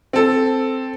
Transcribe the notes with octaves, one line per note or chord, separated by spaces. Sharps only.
C4 A4